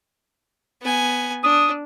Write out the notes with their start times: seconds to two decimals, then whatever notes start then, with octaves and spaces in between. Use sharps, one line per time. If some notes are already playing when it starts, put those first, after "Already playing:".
0.82 B3 G#5
1.44 D4 D#6